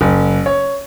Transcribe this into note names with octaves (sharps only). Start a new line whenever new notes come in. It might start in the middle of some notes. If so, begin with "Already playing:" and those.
F#1
C#5